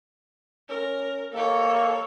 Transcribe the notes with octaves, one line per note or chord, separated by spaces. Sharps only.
C#4 A#4
A#3 A4 C#5